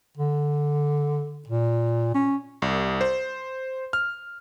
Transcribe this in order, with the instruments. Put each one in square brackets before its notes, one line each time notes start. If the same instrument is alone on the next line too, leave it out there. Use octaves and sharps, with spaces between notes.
[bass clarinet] D3
A#2
C#4
[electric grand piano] C2
C5
F6